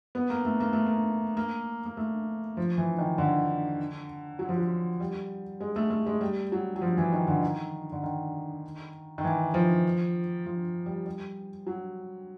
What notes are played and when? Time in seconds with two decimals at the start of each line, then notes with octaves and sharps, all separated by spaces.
0.15 B3
0.30 A#3
0.45 A3
0.60 A#3
0.73 A3
0.86 A#3
1.37 A#3
1.86 A#3
1.97 A3
2.57 F3
2.77 E3
2.98 D#3
3.18 D3
4.39 F#3
4.49 F3
4.58 F#3
5.00 G3
5.60 G#3
5.76 A3
5.90 A3
6.06 G#3
6.21 G3
6.52 F#3
6.76 F#3
6.82 F3
6.97 E3
7.12 D#3
7.28 D3
7.43 D#3
7.92 D3
8.03 D#3
9.18 D#3
9.24 E3
9.54 F3
10.46 F3
10.86 G3
11.06 G3
11.67 F#3